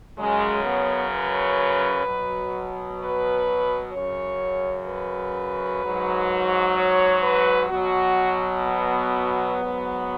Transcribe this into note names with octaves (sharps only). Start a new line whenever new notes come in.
F#2 C#3 F#3 G#3
B3
B4
B2 F#3
B4
F#2 C#3 F#3 C#5
B4
G#2 F#3
C#5
B4
B2 F#3 F#4
B3
G#2 F#3